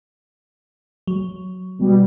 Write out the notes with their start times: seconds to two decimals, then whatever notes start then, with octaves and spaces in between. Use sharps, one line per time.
1.07 F#3
1.79 B2 G3